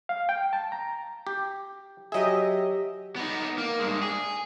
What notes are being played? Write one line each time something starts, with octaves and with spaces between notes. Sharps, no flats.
F5
G5
A5
A#5
G4
F#3 G4 G#4 D#5 E5
B3 D#4
A#3
G2 G#3
G#4